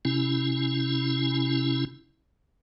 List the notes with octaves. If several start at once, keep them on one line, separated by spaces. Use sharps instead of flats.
C3 C#4 E4